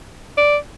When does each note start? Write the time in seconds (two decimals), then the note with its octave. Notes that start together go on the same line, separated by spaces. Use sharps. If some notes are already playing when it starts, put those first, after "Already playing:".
0.38 D5